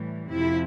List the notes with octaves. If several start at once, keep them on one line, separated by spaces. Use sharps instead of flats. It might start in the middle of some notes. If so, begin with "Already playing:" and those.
Already playing: A2 E3 G3
F2 C3 F3 E4